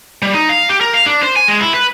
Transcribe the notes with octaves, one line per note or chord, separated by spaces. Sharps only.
G3
D#4
F5
G4
A#4
F5
D4
C5
G#5
G#3
E4
B4